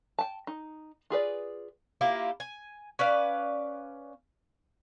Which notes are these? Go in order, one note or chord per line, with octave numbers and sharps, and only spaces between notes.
G5 A5
D#4
F4 G#4 B4 D5
A#3 E4 F4 G4
G#5
C#4 B4 D5 F5